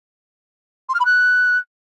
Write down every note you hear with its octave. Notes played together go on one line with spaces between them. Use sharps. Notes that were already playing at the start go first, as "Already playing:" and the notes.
C6
F6
B5
F#6